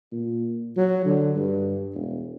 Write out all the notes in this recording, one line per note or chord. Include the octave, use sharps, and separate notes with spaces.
A#2
F#3
D3
G2
E1